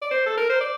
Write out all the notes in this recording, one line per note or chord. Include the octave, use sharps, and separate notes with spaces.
D5
C5
A4
A#4
C5
D5